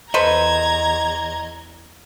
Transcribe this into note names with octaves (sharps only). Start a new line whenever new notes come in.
E2 A4 B4 C5 D#5 A#5 G#6